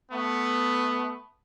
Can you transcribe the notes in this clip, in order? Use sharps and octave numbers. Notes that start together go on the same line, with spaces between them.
A3 B3